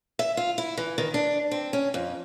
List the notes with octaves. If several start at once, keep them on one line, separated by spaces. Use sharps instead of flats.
E5
F4
E4
E3
D#3
D4
C4
C#4
F2